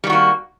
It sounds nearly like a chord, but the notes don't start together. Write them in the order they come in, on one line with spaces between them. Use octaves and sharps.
G3 D#3 F#4 A#3